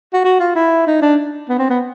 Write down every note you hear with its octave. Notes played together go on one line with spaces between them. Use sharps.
F#4
F#4
F4
E4
D#4
D4
B3
C4
B3